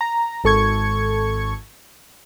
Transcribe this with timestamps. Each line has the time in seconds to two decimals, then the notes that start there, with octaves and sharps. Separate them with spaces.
0.01 A#5
0.44 G#1 A4 C#6 G#6